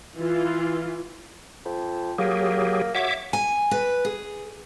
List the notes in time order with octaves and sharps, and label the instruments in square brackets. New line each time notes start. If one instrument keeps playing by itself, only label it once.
[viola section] E3 F4
[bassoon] F2
[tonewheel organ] F#3 G4 G#4 [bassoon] A#3
[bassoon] F#4 [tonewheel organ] C#5 E5 D6
[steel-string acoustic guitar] G#5
B4
G#4